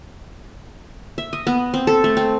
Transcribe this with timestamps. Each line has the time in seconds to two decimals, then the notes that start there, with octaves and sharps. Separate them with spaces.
1.18 E5
1.33 D#5
1.47 B3
1.74 C4
1.87 A4
2.04 A3
2.17 C4